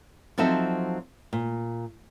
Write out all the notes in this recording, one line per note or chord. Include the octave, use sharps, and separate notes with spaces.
F3 F#3 C4 D#4 A4 E5
A#2